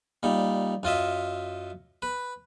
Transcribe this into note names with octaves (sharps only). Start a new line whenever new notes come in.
A#2 G3 D#4
F#2 F4 D#5 E5
B4